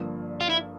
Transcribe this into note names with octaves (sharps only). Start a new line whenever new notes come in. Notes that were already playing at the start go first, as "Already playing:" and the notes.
Already playing: G1 G2 F3 A#3 D4
F4
E4